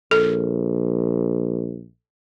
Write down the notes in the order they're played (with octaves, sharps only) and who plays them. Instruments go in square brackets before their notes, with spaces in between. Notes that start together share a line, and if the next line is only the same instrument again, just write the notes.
[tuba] A#1 [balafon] A4